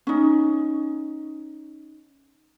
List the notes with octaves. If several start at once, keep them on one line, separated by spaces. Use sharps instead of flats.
C#4 D#4